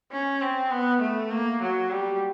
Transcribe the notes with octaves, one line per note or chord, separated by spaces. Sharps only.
C#4
C4
B3
A3
A#3
F#3
G3